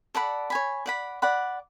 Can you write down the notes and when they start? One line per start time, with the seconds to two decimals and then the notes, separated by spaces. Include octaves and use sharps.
0.15 A4 D5 F#5 B5
0.50 C#5 G#5 B5
0.86 D5 F#5 B5
1.22 D5 F#5 B5